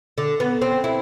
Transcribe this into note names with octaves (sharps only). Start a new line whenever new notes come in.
D3
B3
C4
E4